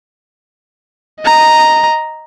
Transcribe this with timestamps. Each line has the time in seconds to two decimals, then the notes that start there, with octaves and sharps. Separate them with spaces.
1.21 D#5 A#5